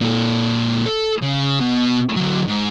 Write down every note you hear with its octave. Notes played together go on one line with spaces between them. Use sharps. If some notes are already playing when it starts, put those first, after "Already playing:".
A#2 A4
A4
C#3
B2
D3 F#3
G#2